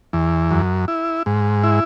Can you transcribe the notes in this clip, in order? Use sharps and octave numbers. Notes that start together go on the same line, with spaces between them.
E2
F#2
E4
G#2
E4